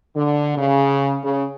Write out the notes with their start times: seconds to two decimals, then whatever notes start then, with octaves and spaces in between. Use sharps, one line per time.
0.16 D3
0.57 C#3
1.24 C#3